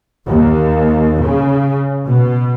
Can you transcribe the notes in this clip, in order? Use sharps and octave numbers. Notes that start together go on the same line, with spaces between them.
D#2
C#3
B2